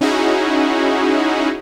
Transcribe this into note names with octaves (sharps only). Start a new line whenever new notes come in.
C#4 D#4 E4 F#4 G#4